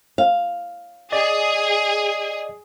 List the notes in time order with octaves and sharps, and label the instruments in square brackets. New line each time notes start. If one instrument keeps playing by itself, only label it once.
[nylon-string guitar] F5
[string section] G#4 [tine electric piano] D5 D#5